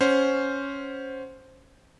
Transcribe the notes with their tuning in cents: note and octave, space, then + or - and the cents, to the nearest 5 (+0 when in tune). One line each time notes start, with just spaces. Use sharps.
C#4 +0 C5 +0 F#5 +0